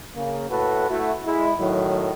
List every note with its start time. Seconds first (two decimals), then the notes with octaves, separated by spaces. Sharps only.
0.15 C#3 A#3
0.50 A2 F#4 A4 B4
0.90 A3 E4 F#4
1.26 G#3 E4
1.60 A2 D#3 F#3